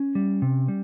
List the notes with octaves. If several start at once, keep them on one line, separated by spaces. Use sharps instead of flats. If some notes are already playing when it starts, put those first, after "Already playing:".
Already playing: C#4
G3
C3
G3